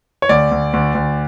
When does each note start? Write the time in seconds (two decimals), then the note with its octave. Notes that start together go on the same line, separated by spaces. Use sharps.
0.22 C#5
0.29 D2 D5
0.51 D2
0.73 D2
0.95 D2